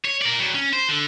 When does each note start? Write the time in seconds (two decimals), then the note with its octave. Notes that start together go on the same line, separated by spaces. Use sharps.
0.05 C#5
0.22 A#4 D5
0.40 F#3 G3
0.54 C#4
0.73 C5
0.89 D3